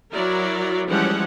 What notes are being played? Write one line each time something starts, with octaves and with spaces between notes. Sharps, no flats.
F#3 E4 A#4 D5
E3 F3 G3 G#3 C#4 F#5